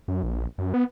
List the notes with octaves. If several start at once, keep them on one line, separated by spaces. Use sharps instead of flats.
F#2
A#1
F#2
B3